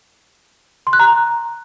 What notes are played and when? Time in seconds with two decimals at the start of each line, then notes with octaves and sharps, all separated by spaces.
0.87 C6
0.93 F#6
1.00 A#5